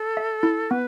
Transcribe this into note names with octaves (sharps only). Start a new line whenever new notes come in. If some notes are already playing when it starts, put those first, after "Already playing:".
Already playing: A4
E5
E4
B3 B4